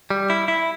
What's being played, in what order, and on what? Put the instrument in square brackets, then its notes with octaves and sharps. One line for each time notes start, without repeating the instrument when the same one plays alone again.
[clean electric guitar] G3
E4
E4